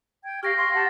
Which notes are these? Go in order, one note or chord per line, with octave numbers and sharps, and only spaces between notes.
G5 G#6
G4 F5 C#6 F6 A#6 C7
F5 C6 C#6
G4 F#5 A5 A6 A#6